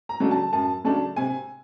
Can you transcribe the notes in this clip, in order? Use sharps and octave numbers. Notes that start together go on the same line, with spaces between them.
A#5
C#3 F#3 A3 D4
A5
F#2 A5
C#3 F#3 A3 D4 A5
C3 G#5